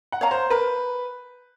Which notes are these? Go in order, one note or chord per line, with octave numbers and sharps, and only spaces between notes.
F#5
C#5 F5 A#5
C5
A#4 B4